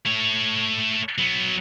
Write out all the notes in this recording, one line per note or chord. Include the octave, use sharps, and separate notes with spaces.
A3 C#5
F#3 B3